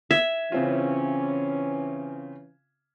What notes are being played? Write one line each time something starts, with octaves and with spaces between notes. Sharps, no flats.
E5 G#6
C#3 E3 C4 C#4 F4